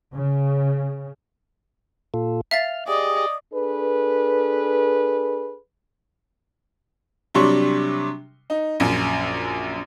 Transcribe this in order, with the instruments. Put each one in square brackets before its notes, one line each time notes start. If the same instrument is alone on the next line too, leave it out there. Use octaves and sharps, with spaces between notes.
[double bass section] C#3
[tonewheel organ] A#2 F4 A4
[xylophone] E5 F5 A6 [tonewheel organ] F6
[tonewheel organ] G4 G#4 [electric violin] D5 D#5 [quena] D#6
[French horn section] D4 G#4 A4 B4
[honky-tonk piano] C3 F#3 G3 D4 C6 C#6
D#4
A#1 F#2